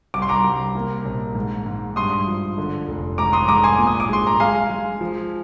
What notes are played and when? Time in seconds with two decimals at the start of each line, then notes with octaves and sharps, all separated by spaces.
0.14 C2 D6
0.22 C6
0.29 A#5 D6
0.44 C2
0.75 A#3
1.05 A#1
1.35 G#2
1.66 G#2
1.96 G2 C6 D#6
2.27 F3
2.58 D3
2.88 F1
3.18 G#2 A#5 D6
3.33 C6 D#6
3.48 G#2 A#5 D6
3.64 G#5 C6
3.79 A#2
3.87 D#6
4.00 D6
4.09 G#3 C6
4.27 A#5
4.40 G#3 F5 G#5
4.70 G#3
5.01 F3